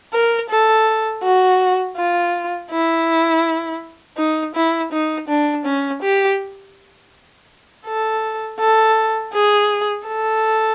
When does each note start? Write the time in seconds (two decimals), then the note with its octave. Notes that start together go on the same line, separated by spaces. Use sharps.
0.13 A#4
0.49 A4
1.23 F#4
1.96 F4
2.71 E4
4.18 D#4
4.55 E4
4.92 D#4
5.28 D4
5.66 C#4
6.02 G4
7.86 A4
8.60 A4
9.33 G#4
10.07 A4